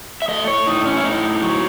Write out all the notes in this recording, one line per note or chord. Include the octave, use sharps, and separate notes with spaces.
E5
A3 D#5
C#5
A2 D#4
C#4
E4
A2 D#4
F#3